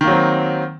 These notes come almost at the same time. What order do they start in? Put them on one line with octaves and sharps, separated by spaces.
D#3 A#3 F#3 C4